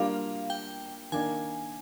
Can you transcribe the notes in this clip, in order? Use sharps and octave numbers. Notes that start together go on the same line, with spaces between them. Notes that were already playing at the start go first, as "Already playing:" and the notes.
Already playing: G3 A#3 D4 F4 F5
G5
D#3 A#3 D4 G#5